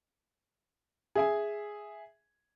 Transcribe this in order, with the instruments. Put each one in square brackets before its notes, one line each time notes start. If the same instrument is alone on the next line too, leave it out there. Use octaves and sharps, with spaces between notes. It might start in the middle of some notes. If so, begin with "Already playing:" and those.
[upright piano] G#4 E5 G#5